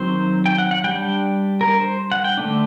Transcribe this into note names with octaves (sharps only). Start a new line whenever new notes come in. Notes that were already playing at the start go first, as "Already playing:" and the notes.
Already playing: D#3 F#3 C4 C5
G5
F#5
F#5
G3 D4 G5
A#4
C5
F#5
G5
D3 A3 D4